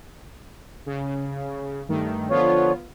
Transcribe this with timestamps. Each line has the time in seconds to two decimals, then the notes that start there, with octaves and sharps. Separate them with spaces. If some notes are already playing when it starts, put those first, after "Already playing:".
0.86 C#3
1.88 G2 D#3 A3
2.30 D3 F3 B3 F4 C#5